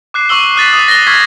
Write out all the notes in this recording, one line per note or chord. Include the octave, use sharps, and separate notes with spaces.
D6 F#6 C7 E7
C#6 D6 E6 G7
D#6 F#6 A6 B6
D#6
A#6 G7
C#6 E6 F6 G#6 B6